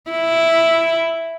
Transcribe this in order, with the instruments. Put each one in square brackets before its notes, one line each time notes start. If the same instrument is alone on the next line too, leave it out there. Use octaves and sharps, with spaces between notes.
[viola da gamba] E4